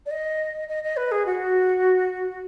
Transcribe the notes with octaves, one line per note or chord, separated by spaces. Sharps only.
D5
D#5
D#5
D#5
B4
G#4
F#4